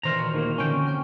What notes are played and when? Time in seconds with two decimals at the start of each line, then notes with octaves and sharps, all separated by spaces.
0.03 A#2 D#3 E3 A#4 C5 A#5
0.18 F#4
0.34 D#3 A3 A#3
0.58 D3 C4 C#4 G5 C#6
0.87 G5 F6